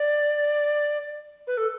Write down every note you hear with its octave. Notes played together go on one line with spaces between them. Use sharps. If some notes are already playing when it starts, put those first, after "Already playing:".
Already playing: D5
B4
A4